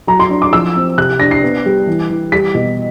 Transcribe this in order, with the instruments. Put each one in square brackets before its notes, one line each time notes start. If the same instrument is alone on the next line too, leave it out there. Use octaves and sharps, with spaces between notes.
[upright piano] F#3 A#5
C6
D4
D6
F3 E6
C4
C3 F#6
D4 A#6
C7
B3
G3
E3
E3
G3 B6
B2